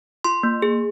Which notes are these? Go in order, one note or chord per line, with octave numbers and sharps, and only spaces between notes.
F4 C6
A#3
G#4